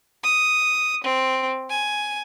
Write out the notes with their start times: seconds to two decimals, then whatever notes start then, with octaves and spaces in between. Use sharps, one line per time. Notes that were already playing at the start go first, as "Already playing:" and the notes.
0.24 D#6
1.04 C4
1.70 G#5